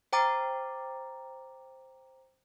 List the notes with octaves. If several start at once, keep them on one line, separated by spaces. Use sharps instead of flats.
C5 G5 A#5 D6 A6